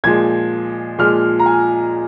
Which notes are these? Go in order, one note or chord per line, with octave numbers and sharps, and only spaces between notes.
A#2 F3 G#3 G#6
A#2 F3 G#3 F6
A#5
G#5